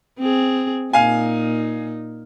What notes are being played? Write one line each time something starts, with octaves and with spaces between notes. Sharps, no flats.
C4 G#4
A#2 D#4 F5 G#5